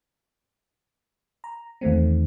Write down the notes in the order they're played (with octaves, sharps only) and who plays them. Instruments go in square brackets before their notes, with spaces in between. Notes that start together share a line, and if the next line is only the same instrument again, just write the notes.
[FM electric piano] A#5
E2 D#3 A3 C4